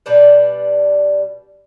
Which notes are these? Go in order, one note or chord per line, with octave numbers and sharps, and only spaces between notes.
B2 G3 D4 B4